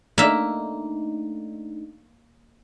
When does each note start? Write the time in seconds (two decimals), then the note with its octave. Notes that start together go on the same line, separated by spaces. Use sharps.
0.18 A3 A#3 D4 D#4 E5